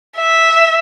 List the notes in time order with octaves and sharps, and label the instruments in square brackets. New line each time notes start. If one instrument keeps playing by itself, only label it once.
[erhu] E5